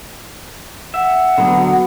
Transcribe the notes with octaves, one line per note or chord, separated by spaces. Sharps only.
E5 F#5
D3 F#3 B3 F#4